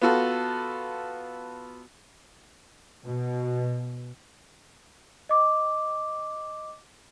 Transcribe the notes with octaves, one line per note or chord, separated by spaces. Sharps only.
B3 F4 F#4 A4
B2
D#5 D6